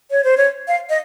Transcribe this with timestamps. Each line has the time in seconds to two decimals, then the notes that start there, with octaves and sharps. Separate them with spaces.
0.11 C#5
0.24 C5
0.37 C#5
0.68 F5
0.90 D#5